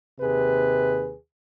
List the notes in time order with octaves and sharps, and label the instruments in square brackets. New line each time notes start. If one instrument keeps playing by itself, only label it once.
[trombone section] D#2 C3 G#4 B4